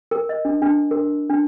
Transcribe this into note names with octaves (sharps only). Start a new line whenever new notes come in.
A#4
D#5
D4
D4
A#4
D4